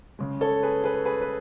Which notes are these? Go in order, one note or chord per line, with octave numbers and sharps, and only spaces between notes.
C#3 G#3
A4 C#5
G#4 B4
G#4 B4
G#4 B4
B4